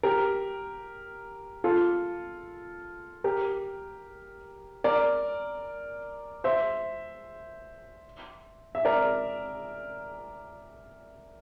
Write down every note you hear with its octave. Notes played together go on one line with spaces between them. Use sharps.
G4 A#4
F4 A4
G4 A#4
A#4 D5
C5 E5
E5
A#4 D5